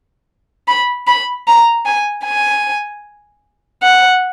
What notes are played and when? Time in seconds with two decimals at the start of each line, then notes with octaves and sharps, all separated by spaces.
0.68 B5
1.07 B5
1.47 A#5
1.85 G#5
2.25 G#5
3.82 F#5